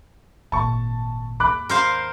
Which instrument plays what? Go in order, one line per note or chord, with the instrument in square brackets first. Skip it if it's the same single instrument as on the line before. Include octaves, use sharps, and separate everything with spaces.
[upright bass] G#1 A#2 [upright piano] A5 C#6
[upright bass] D#2 G#2 [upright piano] B5 D6 F#6
[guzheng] A#4 C5 F5